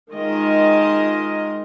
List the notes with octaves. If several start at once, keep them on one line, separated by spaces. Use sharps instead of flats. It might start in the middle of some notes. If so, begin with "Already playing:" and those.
D#3 G#3 F4 A#4 D#5